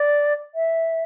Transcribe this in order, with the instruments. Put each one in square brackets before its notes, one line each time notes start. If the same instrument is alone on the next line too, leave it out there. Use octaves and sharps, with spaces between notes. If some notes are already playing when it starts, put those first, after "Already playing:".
Already playing: [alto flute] D5
E5